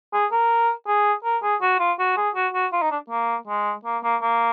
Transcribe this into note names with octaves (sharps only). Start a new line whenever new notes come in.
G#4
A#4
G#4
A#4
G#4
F#4
F4
F#4
G#4
F#4
F#4
F4
D#4
D4
A#3
G#3
A#3
A#3
A#3